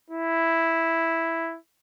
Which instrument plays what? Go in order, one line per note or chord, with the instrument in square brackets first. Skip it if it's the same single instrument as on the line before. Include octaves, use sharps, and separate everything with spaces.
[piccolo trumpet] E4